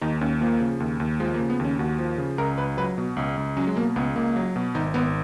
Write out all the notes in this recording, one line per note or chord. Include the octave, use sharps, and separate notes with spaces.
D#2 D#4
D#2 C#4
F3 A#3
C#3
D#2
D#2
F3 G#3
A#3
C#3
B3
D#2 C#4
D#2 F#4
F3
C#3
C#2 A#4
C#2 B4
F#3 B4
B2
C#2
C#2
F#3 C#4
G#3
B2 A#3
C#2 B3
C#2 A#3
F#3
B2
G#1 D#4
G#1 B3